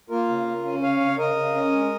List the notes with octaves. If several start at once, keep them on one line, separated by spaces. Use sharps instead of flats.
A#3 F4 A#4
C#3
C#3
C#4
C#3 C#5 F5
C#3
C#3 A#4 D#5
C#3
C#4
G#3